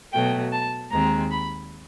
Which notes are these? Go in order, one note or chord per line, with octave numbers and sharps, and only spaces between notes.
B2 F#3 A3 G5
A5
D#2 D#3 G#3 C4 A#5
B5